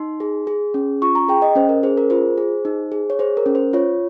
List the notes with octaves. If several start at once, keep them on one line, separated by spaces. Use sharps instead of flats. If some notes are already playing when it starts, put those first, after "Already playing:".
Already playing: D#4 C6
G#4
G#4
C#4
F4 C#6
A#5
G#4 G5
D#5
C#4 C5
A#4
G#4 C5
A#4
F4 C5
G#4
D#4
G#4
C#5
G#4 C5
A#4
C#4
C5
F4 C#5